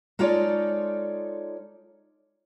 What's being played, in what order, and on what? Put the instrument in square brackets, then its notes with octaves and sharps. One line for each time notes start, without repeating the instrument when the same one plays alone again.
[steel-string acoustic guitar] G#3 D#4 F4 A4 C#5 D5